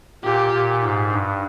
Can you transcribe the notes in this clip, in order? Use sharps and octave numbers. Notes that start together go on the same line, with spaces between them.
A#2 G4
A#2
G#2
G2